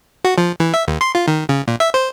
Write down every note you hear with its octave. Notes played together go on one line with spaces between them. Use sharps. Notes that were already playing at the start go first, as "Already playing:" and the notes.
F#4
F3
E3
E5
D#2
C6
F4
D#3
C#3
A#2
E5
C5